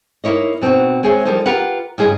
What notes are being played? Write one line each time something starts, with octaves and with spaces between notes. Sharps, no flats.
A#3 D#4 E4 C#5 D#5
B2 C4 C#4 D#4 F#4
G#3 C4 G#4 C#5 E5
F3 G3 A#3 D#4 A4 C5
F4 G4 A#4 B4 F#5
G2 C#3 G#4 A4 D#5